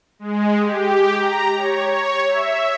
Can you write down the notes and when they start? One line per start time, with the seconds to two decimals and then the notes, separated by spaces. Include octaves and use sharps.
0.19 G#3
0.60 G4
1.15 A#5
1.56 C#5
1.91 C#5
2.27 E5